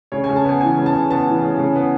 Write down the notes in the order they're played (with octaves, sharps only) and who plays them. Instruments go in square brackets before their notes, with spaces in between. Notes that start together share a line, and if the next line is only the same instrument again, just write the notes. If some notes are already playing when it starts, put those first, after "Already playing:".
[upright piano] C#3 C#5
G#5
C#3
A5
B3 G#5
E3 G#5
C#3
A5
C#3
B3 A5
E3
C#3
C#3
B3